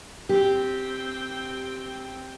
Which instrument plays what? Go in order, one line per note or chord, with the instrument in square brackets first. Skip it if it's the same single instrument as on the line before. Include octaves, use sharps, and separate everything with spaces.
[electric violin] C4 G5 [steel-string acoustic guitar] G4